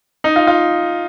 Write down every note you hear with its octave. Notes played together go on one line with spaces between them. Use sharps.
D#4
F4
F4